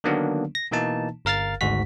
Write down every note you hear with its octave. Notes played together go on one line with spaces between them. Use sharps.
D3 D#3 F#3 A#3 B3 D4
A#6
B2 E3 A#3 D#4 A5
G1 A#4 F5 F6 A6
G#1 D2 G#2 F#4 B6